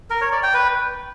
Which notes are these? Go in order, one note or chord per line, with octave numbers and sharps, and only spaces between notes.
A#4
C#5
D5
G5
B4